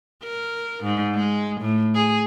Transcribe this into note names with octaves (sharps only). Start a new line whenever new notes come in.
A#4
G#2
G#3
A2
G#4